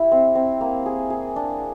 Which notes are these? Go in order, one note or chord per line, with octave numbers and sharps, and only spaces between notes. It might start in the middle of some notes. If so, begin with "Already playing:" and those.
Already playing: E4 G4
C4
C4
A#3
G#4
G#4
D4